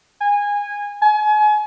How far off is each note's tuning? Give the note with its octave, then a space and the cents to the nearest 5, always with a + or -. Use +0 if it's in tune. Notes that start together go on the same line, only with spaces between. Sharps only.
G#5 -20
G#5 +35